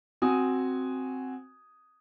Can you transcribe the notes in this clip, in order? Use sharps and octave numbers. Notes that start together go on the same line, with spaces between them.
C4 F#4 G#5 D#6